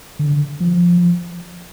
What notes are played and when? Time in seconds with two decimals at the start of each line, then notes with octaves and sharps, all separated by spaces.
0.19 D3
0.60 F3